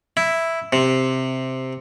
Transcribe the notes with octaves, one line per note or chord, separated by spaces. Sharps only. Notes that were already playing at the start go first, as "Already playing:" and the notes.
E4
C3